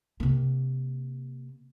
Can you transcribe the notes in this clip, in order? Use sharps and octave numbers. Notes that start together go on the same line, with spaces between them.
C3 A#3